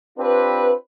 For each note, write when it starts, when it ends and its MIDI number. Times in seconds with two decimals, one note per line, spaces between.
0.18 0.72 60
0.18 0.72 62
0.18 0.72 65
0.18 0.72 67
0.18 0.72 71